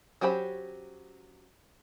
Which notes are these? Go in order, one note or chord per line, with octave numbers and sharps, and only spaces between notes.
F#3 C#4 G4 C5 B5